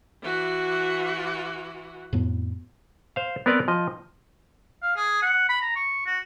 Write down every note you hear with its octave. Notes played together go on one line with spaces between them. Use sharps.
E3 F#4
F2 A2 B3
C5 F5
B3 C4 A#4 B4 D5
F3 D#5
F5
G#4
F#5
B5
A#5
C#6
F#4